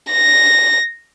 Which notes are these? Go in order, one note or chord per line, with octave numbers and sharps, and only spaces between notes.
A#6